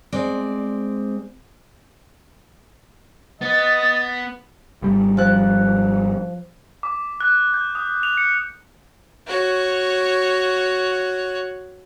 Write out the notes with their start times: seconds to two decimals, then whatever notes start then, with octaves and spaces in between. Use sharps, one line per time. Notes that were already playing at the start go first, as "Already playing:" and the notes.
0.12 G#3 C4 D5
3.41 B3 D#5 A6
4.82 G#1 G3
5.17 F3 F#6
6.83 D6
7.21 F#6
7.54 G6
7.75 D#6
8.03 F7
8.17 C#7
9.27 F#4 C#5